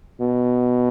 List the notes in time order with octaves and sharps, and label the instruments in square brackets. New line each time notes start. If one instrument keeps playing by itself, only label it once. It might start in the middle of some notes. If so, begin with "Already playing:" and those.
[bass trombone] B2